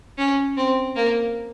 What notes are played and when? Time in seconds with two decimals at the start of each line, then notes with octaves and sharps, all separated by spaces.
0.18 C#4
0.57 C4
0.96 A#3